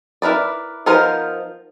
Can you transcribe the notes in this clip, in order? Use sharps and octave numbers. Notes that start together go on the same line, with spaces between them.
E4 A#4 B4 D5
F3 B3 D#4 A#4 C5